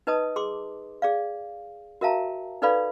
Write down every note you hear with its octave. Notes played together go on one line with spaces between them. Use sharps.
D#4 B4 D#5 A5 D#6
G#4 C6 D6
G#4 D5 F5
F#4 A#4 E5 F5 A5 A#5
D#4 A4 B4 D5 F5 B5